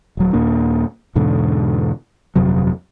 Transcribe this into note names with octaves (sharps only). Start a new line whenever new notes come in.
D#1 F#3
D#2 A#2 A#3 D4
E2 G#2 B2 D3
G1 F2 C3 F#3